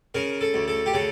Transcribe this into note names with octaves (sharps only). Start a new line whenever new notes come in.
C#3 A#4
A4
D2
A4
G4
C#3 A4